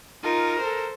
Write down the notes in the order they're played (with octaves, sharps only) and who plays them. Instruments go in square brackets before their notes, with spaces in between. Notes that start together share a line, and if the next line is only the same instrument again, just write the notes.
[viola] D#4 F4 [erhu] A#4
[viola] A4 C5